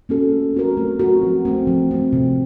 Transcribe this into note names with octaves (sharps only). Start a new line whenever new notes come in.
A#3 C#4 F#4 A4
A3
C4 F#4 A#4
A3
C4 F#4 A#4
F3
A3 C4
F3
A3 C4
C3